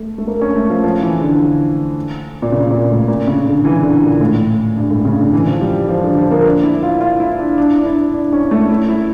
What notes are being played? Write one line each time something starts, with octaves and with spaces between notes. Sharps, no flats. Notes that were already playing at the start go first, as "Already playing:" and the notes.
Already playing: A3
A3
A#3
C#4
A3
F3
F3
E3
D3
A#2
C#3
A#2
A2
A#2
C#3
D3
E3
D3
A#2
A2
G2
A2
C#3
D3
E3
F3
G3
F3
D3
F3
A#3
D4
E4
F4
F4
E4
D4
D4
D4
E4
D4
C#4
A3
E4
E4